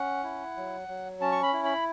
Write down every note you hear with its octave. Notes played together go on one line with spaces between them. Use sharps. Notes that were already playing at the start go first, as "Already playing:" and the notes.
Already playing: C#4 F#5
E4
F#3
F#3
C#4 A5
C#6
B5
E4
B5